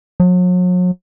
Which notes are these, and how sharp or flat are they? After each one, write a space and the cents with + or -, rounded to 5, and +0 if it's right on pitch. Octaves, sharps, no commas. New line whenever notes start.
F#3 -40